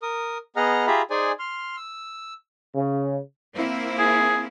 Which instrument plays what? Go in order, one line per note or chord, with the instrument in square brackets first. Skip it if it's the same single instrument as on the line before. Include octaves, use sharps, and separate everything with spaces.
[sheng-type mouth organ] A#4 D#6
B3 G#4 D#5 F#5 A#5 F6
F4 G4 G#4 E5 A#5 B5
D#4 G#4 C5 D5 G#5
C6 F6
E6
[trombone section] C#3
[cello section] A#3 C4 E4
[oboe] G#4